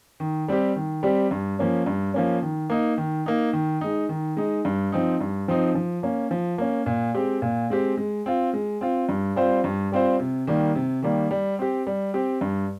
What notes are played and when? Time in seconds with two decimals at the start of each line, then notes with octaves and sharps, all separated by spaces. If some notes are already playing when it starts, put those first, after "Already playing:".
0.20 D#3
0.48 G3 C4 G4
0.76 D#3
1.03 G3 C4 G4
1.31 G2
1.59 F3 A#3 C#4
1.86 G2
2.14 F3 A#3 C#4
2.42 D#3
2.70 A#3 D#4
2.98 D#3
3.26 A#3 D#4
3.53 D#3
3.81 G#3 D#4
4.09 D#3
4.37 G#3 D#4
4.65 G2
4.92 F3 C4 D#4
5.21 G2
5.48 F3 C4 D#4
5.75 F3
6.03 A#3 C#4
6.31 F3
6.58 A#3 C#4
6.86 A#2
7.15 G#3 C4 G4
7.42 A#2
7.70 G#3 C4 G4
7.97 G#3
8.26 C4 F4
8.53 G#3
8.81 C4 F4
9.09 G2
9.36 G3 C4 F4 C5
9.64 G2
9.92 G3 C4 F4 C5
10.19 C3
10.47 D#3 G3 A#3
10.75 C3
11.02 D#3 G3 A#3
11.31 G3
11.59 C4 G4
11.87 G3
12.14 C4 G4
12.41 G2